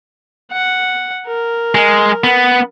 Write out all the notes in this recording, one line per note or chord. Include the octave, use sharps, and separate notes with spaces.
F#5
A#4
G#3
B3